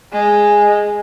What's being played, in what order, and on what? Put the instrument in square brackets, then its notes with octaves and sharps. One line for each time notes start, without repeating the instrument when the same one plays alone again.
[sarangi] G#3